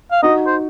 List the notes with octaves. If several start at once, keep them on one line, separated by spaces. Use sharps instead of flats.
F5
D#4 F#4 D#5
C5